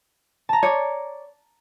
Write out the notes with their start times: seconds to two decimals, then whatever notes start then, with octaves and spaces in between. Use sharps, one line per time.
0.49 A5 A#5
0.63 C#5 D5